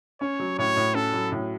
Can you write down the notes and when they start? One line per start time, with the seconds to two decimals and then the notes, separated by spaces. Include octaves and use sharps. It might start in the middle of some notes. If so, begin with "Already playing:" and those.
0.21 C#4 C#5
0.39 F#3
0.58 A2 C#5
0.77 A2
0.94 C#4 A4
1.14 F#3
1.32 A2